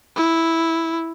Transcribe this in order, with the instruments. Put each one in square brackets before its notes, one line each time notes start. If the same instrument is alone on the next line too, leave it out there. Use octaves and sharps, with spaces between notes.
[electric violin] E4